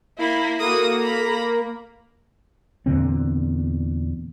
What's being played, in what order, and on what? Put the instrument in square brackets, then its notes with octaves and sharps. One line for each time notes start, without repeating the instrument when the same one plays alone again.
[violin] A#3 E4 [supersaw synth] B5
[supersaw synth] A#3 [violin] F#4 D#6 [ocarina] A4
[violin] A#5 B5
[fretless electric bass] E2 A#2 D3 C4